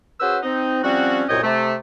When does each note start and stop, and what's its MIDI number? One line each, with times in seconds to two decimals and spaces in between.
0.20 0.38 61
0.20 0.38 66
0.20 0.38 68
0.20 0.38 71
0.20 0.38 72
0.20 0.38 88
0.43 0.80 60
0.43 0.80 63
0.84 1.23 53
0.84 1.23 55
0.84 1.23 60
0.84 1.23 61
0.84 1.23 66
1.29 1.41 36
1.29 1.41 42
1.29 1.41 46
1.29 1.41 73
1.29 1.41 75
1.29 1.41 79
1.44 1.74 48
1.44 1.74 57